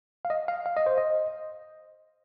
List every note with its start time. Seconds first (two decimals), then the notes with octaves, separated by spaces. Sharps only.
0.25 F5
0.30 D#5
0.48 F5
0.66 F5
0.77 D#5
0.86 C5
0.98 D#5